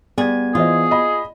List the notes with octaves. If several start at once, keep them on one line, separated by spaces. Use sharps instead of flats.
G3 B3 G#4 G#6
E3 F4 G#4 C5 D#5
D#5 B5